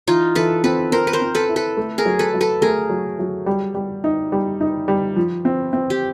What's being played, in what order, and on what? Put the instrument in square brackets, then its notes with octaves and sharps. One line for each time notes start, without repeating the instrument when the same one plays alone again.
[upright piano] E3 [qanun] D#4 F4
[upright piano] E3 [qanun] A4 B4
[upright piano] C4 [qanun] A4 B4
[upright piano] C4 [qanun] A#4 C5
[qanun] B4
A#4 C5
[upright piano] C4
[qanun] A4 B4
[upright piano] E4
[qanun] A4 B4
[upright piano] A3
[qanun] G#4 A#4
[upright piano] F#3
[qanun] A4 B4
[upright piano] F#3
[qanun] A4 B4
[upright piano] A3 [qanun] G#4 A#4
[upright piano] F#3
F#3
G3
G3
D#4
G3
D#4
G3
F3
C4
C4
[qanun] G4